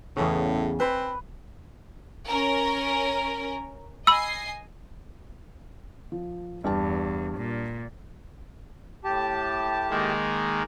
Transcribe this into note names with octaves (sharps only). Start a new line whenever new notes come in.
E2 A2 C#3
C4 B4
C#4 A#4
D#5 G#5 B5 E6 C7
F3
E2 G2 G4 A5
A#2
A2 G4 A5
D#3 G#3 A#3